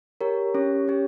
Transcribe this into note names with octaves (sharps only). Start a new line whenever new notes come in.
G4 A#4 C#5
C#4 G4 C#5
C#4 G4 C#5